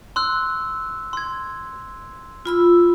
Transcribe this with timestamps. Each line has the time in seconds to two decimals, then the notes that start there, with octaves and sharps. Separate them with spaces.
0.16 C6 E6 F#6
1.13 C6 G#6
2.45 F4 B5 E6